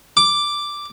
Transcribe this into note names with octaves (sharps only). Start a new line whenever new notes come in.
D6